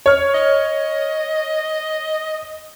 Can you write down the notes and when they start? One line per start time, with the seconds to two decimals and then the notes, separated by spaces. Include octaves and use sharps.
0.06 C#5 F6
0.34 D#5